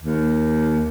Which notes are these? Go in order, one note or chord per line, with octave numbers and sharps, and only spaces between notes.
D#2